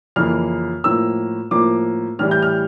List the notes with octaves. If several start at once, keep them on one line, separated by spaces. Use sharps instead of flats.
F2 C#3 E3 A#3 F6
A2 F3 A#3 E6
A2 F3 A#3 D6
A2 E3 G3 F6
G6
F6